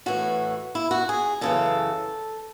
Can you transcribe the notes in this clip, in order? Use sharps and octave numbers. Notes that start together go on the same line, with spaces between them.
A2 E3 F#4
E4
F#4
G#4
F#2 C#3 E3 A4